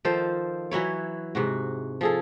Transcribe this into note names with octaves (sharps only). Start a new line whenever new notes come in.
D#3 F3 A4 C5
E3 F#3 E4 C#5
G#2 C3 F#4
F3 G#4 A4